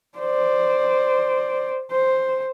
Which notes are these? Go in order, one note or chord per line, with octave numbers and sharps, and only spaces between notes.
C5 D5
C5